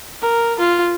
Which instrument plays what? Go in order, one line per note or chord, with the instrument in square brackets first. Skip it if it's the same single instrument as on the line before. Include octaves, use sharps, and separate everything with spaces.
[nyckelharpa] A#4
F4